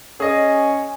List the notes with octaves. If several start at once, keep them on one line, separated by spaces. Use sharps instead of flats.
C#4 G#4 D#5